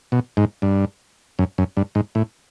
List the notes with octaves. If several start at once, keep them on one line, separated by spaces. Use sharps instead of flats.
B2
G#2
G2
F#2
F#2
G2
G#2
A2